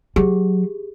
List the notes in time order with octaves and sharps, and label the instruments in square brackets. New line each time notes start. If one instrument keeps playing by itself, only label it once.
[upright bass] F#3 [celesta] G4 G#4